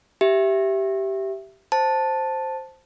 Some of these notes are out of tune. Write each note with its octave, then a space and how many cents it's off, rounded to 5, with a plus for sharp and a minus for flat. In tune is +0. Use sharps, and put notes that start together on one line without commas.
G4 -10 E5 +10
C5 +0 A5 +0